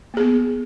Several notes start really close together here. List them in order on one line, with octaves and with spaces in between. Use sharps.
A#3 G#4 B3